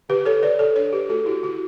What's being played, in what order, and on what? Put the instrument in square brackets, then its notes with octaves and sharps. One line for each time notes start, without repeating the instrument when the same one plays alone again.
[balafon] D3 G4 B4
A4 C#5
D3 B4 D5
A4 C#5
D4 A4 C#5
G4 B4
A3 F#4 A4
E4 G4
D3 F#4